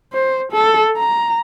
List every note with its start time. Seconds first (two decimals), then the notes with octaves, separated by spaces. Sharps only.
0.13 C5
0.52 A4
0.96 A#5